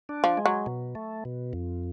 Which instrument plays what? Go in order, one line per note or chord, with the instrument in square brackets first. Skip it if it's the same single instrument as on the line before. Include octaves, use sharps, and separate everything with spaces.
[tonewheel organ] D4
[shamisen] F3
[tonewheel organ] G#3
[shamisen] F#3
[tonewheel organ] B2
A3
B2
F2